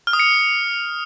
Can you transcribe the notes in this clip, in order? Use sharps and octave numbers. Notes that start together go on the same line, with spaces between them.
F6
D#6
C#7